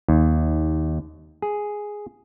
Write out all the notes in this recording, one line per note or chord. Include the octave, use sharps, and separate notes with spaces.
D#2
G#4